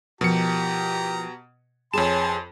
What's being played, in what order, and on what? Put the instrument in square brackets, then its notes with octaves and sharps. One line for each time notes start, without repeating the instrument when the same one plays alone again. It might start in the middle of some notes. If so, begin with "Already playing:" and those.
[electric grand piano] B2 C#7 [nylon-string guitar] F3 A#4 [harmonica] G4 A#5
[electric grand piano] F2 E7 [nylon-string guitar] G#4 B4 C#5 [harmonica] G#5 A5 C6